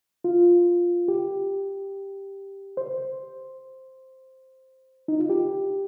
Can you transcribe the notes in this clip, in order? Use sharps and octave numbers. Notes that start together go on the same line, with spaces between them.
F4
G4
C5
D#4
F4
G4